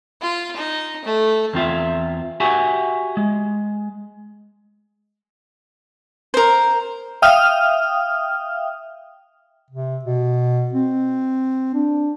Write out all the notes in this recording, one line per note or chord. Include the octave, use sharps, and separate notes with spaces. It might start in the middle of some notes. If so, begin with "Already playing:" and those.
F4
D#4
A3
E2 C4 F4 E5
F#4 G4 E5 F#5 G#5
G#3
A#4 C5
E5 F5 G5 D#6 F6
C3
B2
C4
D4